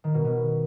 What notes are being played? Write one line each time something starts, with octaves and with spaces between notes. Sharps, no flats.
D#3
B2
B3